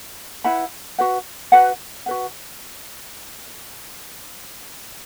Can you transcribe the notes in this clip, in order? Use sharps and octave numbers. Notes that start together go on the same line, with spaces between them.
E4 B4 F#5 B5
F#4 B4 F#5
F#4 B4 F#5
F#4 B4 F#5